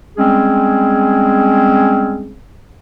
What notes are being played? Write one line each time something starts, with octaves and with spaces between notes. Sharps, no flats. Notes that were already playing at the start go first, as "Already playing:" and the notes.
G3 G#3 C4 C#4 G#4